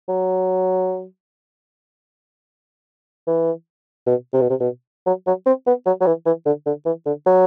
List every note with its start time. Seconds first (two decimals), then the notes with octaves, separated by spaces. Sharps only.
0.09 F#3
3.27 E3
4.06 B2
4.34 C3
4.42 B2
4.50 C3
4.60 B2
5.06 F#3
5.27 F#3
5.46 C4
5.67 B3
5.86 F#3
6.01 F#3
6.07 E3
6.26 E3
6.46 D3
6.66 D3
6.86 E3
7.06 D3
7.26 F#3